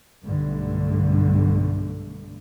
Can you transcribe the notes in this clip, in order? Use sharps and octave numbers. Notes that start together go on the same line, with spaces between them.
B1 G2 D3 A3